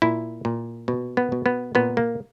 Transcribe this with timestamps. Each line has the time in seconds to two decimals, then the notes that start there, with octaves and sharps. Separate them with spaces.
0.02 A#2 E4
0.45 A#2
0.88 B2
1.17 B3
1.32 B2
1.46 B3
1.75 A#2 B3
1.97 A#3